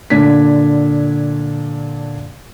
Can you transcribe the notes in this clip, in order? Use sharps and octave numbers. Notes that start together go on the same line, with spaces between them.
A#2 D3 D4 G#6 B6